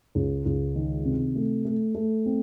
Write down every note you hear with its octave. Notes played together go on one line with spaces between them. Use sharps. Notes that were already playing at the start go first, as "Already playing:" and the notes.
C#2
C#2
D#3
C3
A3
A3
A3
C4